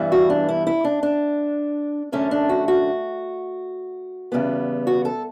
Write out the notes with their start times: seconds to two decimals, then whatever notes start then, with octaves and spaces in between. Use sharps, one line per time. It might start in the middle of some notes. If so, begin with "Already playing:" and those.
Already playing: G2 E3 G3 B3
0.12 F#4
0.30 D4
0.49 E4
0.67 E4
0.84 D4
1.03 D4
2.12 F#2 D3 A3 C#4
2.31 D4
2.49 F#4
2.68 F#4
4.32 E2 C#3 G3 B3
4.87 F#4
5.05 A4